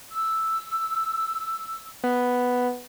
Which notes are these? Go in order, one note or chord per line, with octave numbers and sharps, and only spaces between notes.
E6
B3